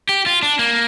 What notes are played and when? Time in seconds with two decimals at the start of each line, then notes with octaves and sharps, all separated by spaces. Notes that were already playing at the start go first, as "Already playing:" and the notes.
0.09 G4
0.26 F4
0.43 D4
0.59 A#3